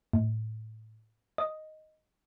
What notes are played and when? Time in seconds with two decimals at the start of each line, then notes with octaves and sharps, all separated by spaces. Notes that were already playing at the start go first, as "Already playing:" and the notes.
0.13 A2
1.38 D#5